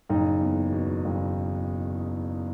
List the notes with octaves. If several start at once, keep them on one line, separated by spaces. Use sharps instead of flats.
F#1 D#4
E2
B2
F#1